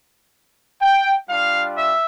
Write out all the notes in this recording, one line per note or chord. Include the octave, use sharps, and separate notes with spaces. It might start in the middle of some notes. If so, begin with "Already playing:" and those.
G5
G3 D4 F4 F5
E5